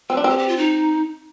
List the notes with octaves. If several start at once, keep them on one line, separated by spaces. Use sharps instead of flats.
C4 B4
D4
C4 G4
G4
F4
D#4